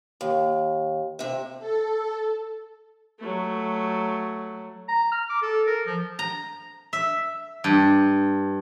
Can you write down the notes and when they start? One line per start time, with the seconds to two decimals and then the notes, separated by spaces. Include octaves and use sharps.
0.21 D#2
1.19 C3 E5
1.59 A4
3.19 F#3 A3
4.89 A#5
5.12 F6
5.30 D6
5.42 A4
5.67 A#4
5.86 F3
6.19 A#5
6.93 E5
7.64 G2